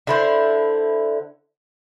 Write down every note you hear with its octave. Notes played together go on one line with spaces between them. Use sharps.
D3 E4 C5